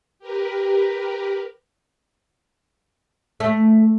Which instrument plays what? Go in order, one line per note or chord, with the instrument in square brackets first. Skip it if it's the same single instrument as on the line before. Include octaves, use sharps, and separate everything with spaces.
[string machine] G4 A#4 B4
[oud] A3